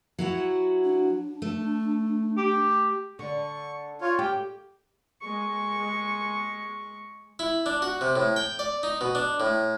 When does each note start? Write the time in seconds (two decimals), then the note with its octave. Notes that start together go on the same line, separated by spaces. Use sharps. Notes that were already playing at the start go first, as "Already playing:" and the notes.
0.19 F#3 E4 F#4
0.84 D4
1.42 A3
2.38 G4
3.19 D3 C#6
4.01 F4 C#5
4.19 G4 G5
5.22 G#3 C#6
7.39 E4
7.66 D4
7.82 F#4
8.01 C3
8.16 A2
8.36 G5
8.59 D5
8.83 D#4
9.01 B2
9.15 D4
9.40 A2